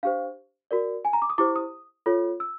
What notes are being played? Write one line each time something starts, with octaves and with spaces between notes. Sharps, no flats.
D4 G4 C5 F5
F#4 A#4 D5
G#5
A#5
D6
D#6
E4 G4 C5 D6
D#6
F4 A4 C#5
E6